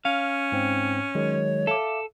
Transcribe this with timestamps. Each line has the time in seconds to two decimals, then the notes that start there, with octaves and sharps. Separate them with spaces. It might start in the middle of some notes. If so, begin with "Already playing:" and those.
0.05 C#4 F5
0.52 G#2 C4
1.15 D#3 F#3 G#3 C#5
1.67 A4 E5 F5 D6